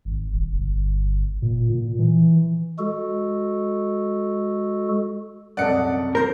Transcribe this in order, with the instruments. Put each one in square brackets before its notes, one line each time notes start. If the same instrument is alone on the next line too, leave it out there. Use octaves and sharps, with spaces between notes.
[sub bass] G#1
D#1
G1
A#2
A#2
E3
[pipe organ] G#3 F#4 A4
[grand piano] C2 F#2 [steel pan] A4 D#5 F#5 [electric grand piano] D5 C#7
[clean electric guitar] A#4 [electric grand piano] C5 G6